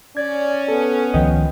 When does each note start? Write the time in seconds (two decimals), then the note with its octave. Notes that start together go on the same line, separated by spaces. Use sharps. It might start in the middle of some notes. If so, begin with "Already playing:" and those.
0.17 C#4 D5 G#6
0.68 B3 A4
1.14 C#2 D#3 F3 D#5 G5